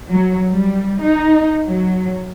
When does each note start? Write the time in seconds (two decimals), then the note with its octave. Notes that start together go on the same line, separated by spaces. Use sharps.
0.11 F#3
0.52 G3
1.02 D#4
1.67 F#3